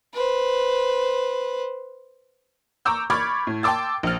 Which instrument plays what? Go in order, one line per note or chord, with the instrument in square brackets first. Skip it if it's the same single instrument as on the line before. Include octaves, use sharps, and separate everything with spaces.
[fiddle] B4 C5
[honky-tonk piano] A#5 C#6 D6 E6 G6
B5 C#6 D6 F6 G#6 A6
A2
G5 A5 C6 D6 E6 A6
A#1 F6